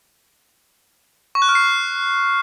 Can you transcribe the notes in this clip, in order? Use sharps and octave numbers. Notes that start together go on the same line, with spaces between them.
C#6
F#6
F6
C7